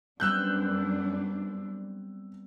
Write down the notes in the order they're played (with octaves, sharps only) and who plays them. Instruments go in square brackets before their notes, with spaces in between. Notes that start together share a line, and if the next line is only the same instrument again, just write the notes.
[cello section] F#2 D4 [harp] G3 B3 C4 [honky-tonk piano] E6 F#6 G6